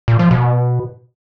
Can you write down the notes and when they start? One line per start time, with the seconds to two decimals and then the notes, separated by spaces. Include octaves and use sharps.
0.08 A#2
0.19 F3
0.31 B2